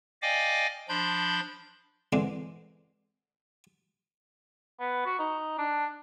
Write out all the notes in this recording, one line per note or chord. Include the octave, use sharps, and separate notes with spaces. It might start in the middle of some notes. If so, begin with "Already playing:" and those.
D5 D#5 F5 G5 G#5 D6
F3 D4 B5 C6 G6
D3 E3 G#3 C4 D4
B3
F#4
D#4
D4